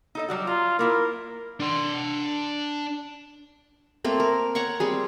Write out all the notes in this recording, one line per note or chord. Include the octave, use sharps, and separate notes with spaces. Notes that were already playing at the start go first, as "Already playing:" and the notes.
D#4 A4 D#5
F#3 G3 F#4
F4 A#5
A#3 E4 F4 A#4
D4 C6
A3 A#3 C4
A#4
C#5 F#5 A#5 C#6
G3 C4 G#4